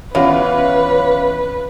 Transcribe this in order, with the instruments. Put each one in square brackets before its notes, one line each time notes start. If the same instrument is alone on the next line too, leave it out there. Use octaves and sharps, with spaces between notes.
[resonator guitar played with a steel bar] E2 [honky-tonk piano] C#4 F4 [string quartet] B4